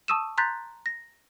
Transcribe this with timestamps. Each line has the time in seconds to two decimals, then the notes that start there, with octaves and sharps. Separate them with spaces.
0.08 A5 C#6 D#6 E6 D#7 E7
0.38 A#5 C6 F#6 G6 A6 B6
0.86 A#6